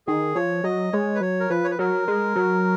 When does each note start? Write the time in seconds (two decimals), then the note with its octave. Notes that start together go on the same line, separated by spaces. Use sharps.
0.07 D#3 G#4
0.35 F3 C#5
0.64 F#3 D#5
0.93 G#3 C#5
1.15 B4
1.21 F#3 C#5
1.40 A#4
1.50 F3 B4
1.64 C#5
1.71 B4
1.79 F#3 A#4
2.08 G#3
2.35 F#3